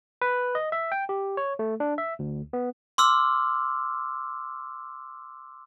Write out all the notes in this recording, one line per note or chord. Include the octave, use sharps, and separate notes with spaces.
B4
D#5
E5
G5
G4
C#5
A3
D4
E5
D2
B3
C6 D6 E6 F6